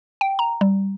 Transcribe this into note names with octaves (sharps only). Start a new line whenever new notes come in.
G5
A#5
G3